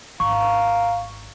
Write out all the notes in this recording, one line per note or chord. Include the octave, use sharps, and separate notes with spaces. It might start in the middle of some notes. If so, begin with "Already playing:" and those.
G#1 F5 A#5 C#6